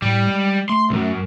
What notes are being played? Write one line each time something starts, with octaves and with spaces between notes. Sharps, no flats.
A2 G3
G#3
A3 C6
B1 F#2